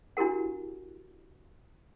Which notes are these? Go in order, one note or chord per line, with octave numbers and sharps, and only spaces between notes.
D4 E4 F#4 G4 A#4 F#5